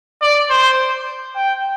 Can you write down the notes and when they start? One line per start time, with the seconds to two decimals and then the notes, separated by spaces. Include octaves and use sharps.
0.21 D5
0.50 C5
1.35 G5